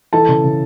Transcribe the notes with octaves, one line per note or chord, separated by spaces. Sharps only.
E3 A4 A5
C#3
C#3